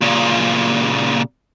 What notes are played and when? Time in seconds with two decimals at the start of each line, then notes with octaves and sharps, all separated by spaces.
0.01 A#2 C#3